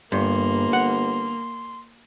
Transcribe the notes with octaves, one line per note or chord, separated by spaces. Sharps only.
G1 G2 A#3 C6
F#5